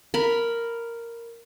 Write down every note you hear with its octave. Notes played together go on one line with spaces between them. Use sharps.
A#4 B5